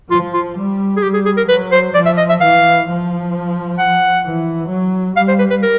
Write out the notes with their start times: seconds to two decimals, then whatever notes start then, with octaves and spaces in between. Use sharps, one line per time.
0.11 F3 F4
0.34 F4
0.57 G3
0.97 G#4
1.03 G3 G4
1.14 G#4
1.26 G#4
1.37 A#4
1.49 F#3 B4
1.72 C5
1.95 F3 D5
2.06 E5
2.18 D#5
2.30 E5
2.41 E3 F5
2.87 F3
3.79 F#5
4.25 E3
4.71 F#3
5.17 G3 F5
5.28 C5
5.39 B4
5.50 B4
5.63 A#4